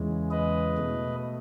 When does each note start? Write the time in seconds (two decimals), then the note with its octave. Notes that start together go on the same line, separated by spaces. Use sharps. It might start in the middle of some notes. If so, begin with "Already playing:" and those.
Already playing: E2 C#3 E3 G#3
0.31 B4 D#5
0.78 B2 A3